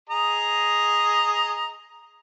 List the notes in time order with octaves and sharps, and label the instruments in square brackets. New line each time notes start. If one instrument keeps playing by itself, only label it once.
[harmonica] G#4 D#5 A#5